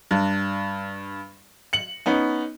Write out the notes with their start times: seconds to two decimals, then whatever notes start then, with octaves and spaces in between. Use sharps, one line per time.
0.11 G2
1.73 C#7 F#7
2.06 B3 C#4 D#4